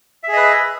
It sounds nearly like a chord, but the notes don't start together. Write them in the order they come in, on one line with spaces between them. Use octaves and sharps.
E5 G#4 D#5 B4